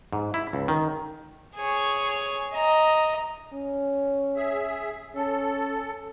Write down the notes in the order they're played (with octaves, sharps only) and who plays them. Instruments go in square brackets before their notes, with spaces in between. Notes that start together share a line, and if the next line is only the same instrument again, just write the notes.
[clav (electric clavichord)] G#2
E4
C#2
D#3
[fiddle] G#4 C#5
D#5 A#5
[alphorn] C#4
[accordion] G#4 E5
[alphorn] C#4 [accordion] A4